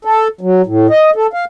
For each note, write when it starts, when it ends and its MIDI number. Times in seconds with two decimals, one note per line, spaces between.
0.05 0.28 69
0.41 0.62 54
0.66 0.87 45
0.90 1.10 75
1.16 1.27 69
1.33 1.45 77